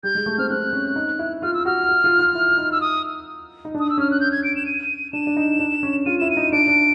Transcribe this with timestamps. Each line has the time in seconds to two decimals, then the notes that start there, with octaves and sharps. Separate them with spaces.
0.03 G3 G6
0.15 G#3
0.26 A3
0.38 C4 F6
0.50 C4 F#6
0.73 C#4
0.96 D#4
1.19 E4
1.42 F4 F6
1.54 E6
1.65 F#4 F6
1.89 F#4
2.04 F4
2.19 F4
2.35 E4
2.58 D#4
2.72 E6
2.81 D#6
3.65 D#4
3.75 D4
3.80 D#6
3.90 E6
3.98 C#4 F6
4.11 F#6
4.20 G6
4.32 G#6
4.44 D7
4.56 E7
4.66 D#7
5.13 D4 E7
5.27 D4
5.37 D#4
5.59 D4
5.83 C#4
6.06 F4 D#7
6.19 E4 E7
6.31 D#7
6.37 D#4
6.52 D4 D7
6.68 D4